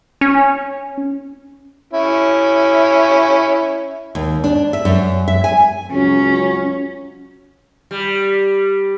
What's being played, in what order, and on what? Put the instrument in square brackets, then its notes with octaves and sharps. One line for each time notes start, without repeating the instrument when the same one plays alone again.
[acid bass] C#4
[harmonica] C#4 E4
[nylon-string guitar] D#2
D4
E5
F#2
E5
G#5
[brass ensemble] C#2 F#3 [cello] C#4
[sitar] G3